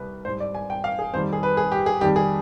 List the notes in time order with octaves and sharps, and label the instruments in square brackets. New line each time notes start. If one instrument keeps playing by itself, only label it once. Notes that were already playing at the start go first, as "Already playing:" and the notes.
Already playing: [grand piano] C2 G3 B4
G#2 G3 C5
D5
G#5
G5
F5
G#4
F2 D#3 G3 C5
G#4
B4
G#4
G4
G#4
F2 D#3 G3 G4
G#4